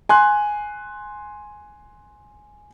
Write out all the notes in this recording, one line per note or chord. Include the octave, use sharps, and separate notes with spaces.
G#5 C6 F#6